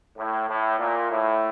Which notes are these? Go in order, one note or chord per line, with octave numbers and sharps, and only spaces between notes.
A2
A2
A#2
A2